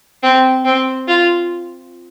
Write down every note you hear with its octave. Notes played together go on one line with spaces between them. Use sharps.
C4
C4
F4